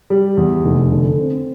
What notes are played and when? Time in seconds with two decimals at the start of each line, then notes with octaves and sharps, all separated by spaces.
0.10 G3
0.37 E2
0.65 F1
0.92 D3
1.19 C4